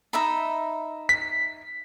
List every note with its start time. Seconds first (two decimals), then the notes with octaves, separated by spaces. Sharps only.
0.13 D#4 E5 B5
1.09 B6